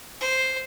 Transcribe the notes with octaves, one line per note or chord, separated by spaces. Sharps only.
C5